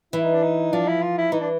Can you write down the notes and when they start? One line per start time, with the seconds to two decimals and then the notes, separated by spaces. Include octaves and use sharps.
0.13 E3 E4
0.23 D#4
0.33 D4
0.42 D#4
0.72 F3 D4
0.87 E4
1.02 F4
1.18 E4
1.32 E3 D#4
1.40 D4